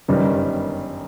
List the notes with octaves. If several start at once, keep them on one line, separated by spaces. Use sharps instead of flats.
G1 F#2 D#3 G3